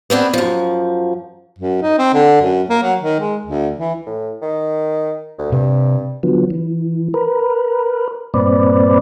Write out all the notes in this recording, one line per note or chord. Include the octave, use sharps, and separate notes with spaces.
B3 C4 D4 G#4
F#2 F3
F#2
D#4
C4
D3
F#2
A#3
F#3
D#3
G#3
D2
E3
A2
D#3
D2
G2 C3
D3 F3 F#3 B3
E3
A#4 B4
G2 A#2 C4 B4 D5